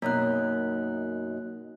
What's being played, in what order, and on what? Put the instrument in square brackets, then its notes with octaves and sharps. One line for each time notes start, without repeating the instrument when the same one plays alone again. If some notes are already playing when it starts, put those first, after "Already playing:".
[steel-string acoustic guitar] F#2 B2 D#4 [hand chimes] A#3 F#6